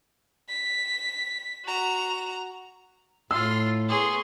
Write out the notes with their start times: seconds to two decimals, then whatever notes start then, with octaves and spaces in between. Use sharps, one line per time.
0.49 B6
1.66 F#4 A#5
3.31 A2 F4 C6 E6
3.89 B3 G#4 C6 C#6